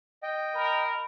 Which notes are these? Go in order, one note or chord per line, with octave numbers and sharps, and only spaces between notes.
D#5 G5
A#4 B5